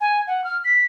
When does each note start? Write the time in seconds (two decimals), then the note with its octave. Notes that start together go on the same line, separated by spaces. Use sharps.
0.01 G#5
0.27 F#5
0.44 F6
0.65 B6